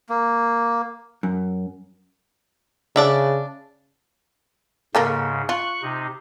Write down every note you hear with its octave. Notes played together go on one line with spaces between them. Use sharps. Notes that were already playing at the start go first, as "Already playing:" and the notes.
A#3
F#2
C#3 D4 D5 E5
G#2 C#3 A#3 A4 A#4
F4 C#6 F#6
C3 D#4